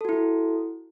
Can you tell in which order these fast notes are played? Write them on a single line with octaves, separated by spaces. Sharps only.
A4 F#4 E4